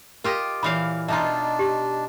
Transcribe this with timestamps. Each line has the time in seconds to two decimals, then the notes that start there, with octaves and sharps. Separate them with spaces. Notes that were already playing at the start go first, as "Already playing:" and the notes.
0.24 F4 G4 A#4 D#5
0.63 A#2 E3 C#5 F5 B5
1.08 B2 D4 D#4 F4 E5 A#5
1.59 G4